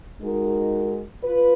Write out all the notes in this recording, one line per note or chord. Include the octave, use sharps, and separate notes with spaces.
G#3 D#4 F#4 A#4
F4 B4